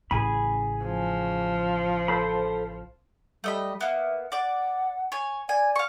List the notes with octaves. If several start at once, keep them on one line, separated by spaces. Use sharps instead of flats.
A1 C#3 G#4 G#5 B5
F3
A4 C5 B5
G3 A3 D#5 B5
A#3 B3 E5
D5 F#5 D6
C#5 G#5
D5 G#5
F5 C#6